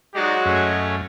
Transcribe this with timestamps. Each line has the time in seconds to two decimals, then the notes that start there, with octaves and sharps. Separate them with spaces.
0.15 F#3 G#3 D#4 F#4 D5 D#5
0.45 F#2 A3 C#4